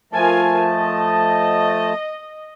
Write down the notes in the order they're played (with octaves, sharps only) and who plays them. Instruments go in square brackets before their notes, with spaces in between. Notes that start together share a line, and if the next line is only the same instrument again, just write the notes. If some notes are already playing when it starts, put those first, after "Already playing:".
[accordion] F3 A3 A5 [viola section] F4 A#4 G#5
[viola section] D#5